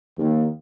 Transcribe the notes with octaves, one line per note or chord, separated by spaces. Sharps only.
D#2